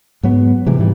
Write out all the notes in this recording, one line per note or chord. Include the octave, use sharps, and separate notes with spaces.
G#2 F#3 B3
C3 E3 G#3
G#2 E3 G3